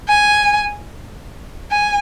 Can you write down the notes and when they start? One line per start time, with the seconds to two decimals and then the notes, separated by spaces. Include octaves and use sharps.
0.09 G#5
1.71 G#5